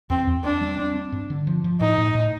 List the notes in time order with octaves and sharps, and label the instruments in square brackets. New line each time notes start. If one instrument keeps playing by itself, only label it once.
[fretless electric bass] E2 [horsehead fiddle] C4
[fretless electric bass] E2
[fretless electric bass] C4 [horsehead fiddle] D4
[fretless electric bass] G3
C4
C4
G2
D3
F3
F3
[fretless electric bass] A2 [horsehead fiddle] D#4
[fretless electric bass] A2
A2